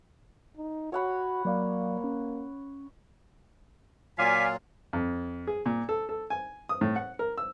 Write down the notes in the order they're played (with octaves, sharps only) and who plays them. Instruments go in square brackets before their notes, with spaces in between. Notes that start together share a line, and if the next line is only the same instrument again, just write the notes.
[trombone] D#4
[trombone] F#4 [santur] C#5 F#5 B5
[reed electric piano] F#3 D5 F5 [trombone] A#3
[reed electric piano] C#4
[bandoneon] A#2 F#3 F4 [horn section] D5 G#5 [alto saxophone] F5 [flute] B6
[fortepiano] F2
G#4
A#2
A4
A4
G#5
D#6
A2
F#5
A#4
E6